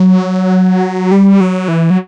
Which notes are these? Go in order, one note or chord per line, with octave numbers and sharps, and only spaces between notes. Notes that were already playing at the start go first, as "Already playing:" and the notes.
Already playing: F#3
G3
F#3
E3
F#3